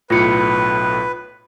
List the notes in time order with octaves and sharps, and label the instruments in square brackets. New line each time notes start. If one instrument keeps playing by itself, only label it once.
[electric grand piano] B1 A2 [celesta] F4 C#7 [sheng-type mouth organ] B4